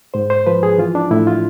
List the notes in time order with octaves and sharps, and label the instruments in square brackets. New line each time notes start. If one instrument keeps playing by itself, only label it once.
[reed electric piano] G#2 C5
C5
F3 B4
G#4
E3 F4
D4
A2 E4
F4